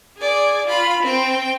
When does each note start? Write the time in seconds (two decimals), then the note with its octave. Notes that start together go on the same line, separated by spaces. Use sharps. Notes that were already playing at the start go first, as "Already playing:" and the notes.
0.17 G#4 D5
0.67 F4 B5
1.03 C4 G5